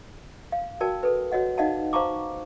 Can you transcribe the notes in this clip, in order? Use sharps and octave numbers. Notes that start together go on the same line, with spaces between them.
F5
F#4 A#4 D5 G5 A5
A4 B4
F#4 C#5 D#5 F#5
D#4 D5 D#5 F5 F#5 A5
C5 F5 A5 A#5 C#6 D6